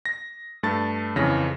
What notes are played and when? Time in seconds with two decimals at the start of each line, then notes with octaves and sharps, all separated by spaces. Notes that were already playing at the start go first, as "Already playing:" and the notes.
0.05 A#6
0.63 G2 A3 A5 A6
1.16 F2 C#3 E3 C#5 A#6